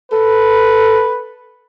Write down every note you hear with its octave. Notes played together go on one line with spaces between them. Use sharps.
A4 B4